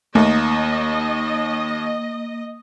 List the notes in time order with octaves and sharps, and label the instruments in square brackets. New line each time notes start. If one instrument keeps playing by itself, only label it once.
[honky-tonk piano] D#2 [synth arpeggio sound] A3 [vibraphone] A#3 [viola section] D#5